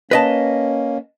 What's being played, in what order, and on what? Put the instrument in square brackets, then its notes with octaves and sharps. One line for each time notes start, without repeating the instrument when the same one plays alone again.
[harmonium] A#3 C#4 [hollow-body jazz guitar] B4 D#5 A5